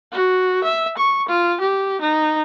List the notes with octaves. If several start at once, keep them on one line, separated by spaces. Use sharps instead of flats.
F#4
E5
C#6
F4
G4
D#4